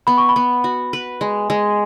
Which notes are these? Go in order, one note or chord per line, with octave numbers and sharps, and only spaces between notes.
B3 B5
C#6
B5
B3
F#4
B4
G#3
G#3